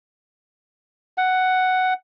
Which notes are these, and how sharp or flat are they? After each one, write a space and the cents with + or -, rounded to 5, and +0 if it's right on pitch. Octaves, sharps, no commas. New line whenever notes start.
F#5 +5